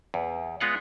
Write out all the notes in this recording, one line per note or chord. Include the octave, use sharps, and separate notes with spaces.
E2
G#3 B3 F4 F#5